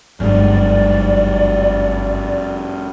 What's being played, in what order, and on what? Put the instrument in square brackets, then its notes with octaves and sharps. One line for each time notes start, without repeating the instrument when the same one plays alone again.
[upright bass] G1 [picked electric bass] F#2 G#3 [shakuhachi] D5